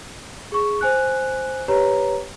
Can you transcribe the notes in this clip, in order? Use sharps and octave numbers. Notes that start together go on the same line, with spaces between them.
G#4 C#6
C5 G#5 F#6
G4 B4 C#5 A#5